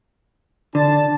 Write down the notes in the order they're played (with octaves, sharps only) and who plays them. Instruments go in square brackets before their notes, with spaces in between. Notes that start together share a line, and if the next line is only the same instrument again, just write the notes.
[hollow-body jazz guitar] D3 [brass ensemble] D4 A5